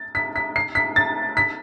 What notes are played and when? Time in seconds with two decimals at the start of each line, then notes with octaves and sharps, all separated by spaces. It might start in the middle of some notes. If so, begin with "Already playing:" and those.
Already playing: A6
0.15 B6
0.36 B6
0.56 C7
0.75 B6
0.96 A6
1.37 B6